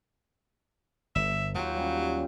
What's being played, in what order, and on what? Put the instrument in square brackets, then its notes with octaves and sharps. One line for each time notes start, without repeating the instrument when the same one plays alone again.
[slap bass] G1 [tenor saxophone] E5
[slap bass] D#2 [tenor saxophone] F#3 [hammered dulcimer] F4 G5
[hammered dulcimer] G3 C#4